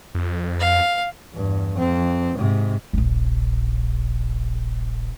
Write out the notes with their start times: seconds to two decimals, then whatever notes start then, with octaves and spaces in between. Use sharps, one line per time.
0.15 F2
0.60 F5
1.34 E2 G2
1.75 F2 C4
2.36 G#2 C3
2.93 D#1 A#1